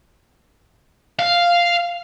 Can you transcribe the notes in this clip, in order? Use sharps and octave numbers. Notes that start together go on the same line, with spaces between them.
F5